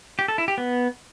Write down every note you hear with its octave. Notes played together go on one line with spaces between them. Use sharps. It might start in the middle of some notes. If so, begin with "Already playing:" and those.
G4
A4
E4
G4
B3